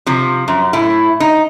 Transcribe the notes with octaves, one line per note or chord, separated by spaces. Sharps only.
C3 F3
F#2
A2 E4
D#4